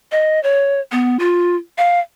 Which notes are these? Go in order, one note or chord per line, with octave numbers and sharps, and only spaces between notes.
D#5
C#5
B3
F4
F5